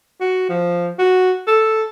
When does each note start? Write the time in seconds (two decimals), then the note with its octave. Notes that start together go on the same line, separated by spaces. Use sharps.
0.20 F#4
0.49 F3
0.99 F#4
1.47 A4